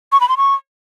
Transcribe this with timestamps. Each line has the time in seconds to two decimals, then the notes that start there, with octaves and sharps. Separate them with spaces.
0.12 C#6
0.21 B5
0.29 C6
0.37 C#6